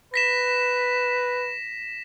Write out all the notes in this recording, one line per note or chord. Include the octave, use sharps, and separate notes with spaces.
B4 A#6 B6 E7